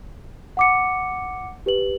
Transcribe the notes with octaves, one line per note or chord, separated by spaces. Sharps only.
F#5 D6 C#7
G4 B4 F#7